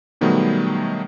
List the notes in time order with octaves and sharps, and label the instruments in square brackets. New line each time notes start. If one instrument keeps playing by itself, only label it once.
[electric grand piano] B2 D#3 F#3 G3 A3 B3